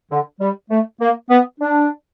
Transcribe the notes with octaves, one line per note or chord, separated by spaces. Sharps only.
D3
G3
A3
A#3
B3
D4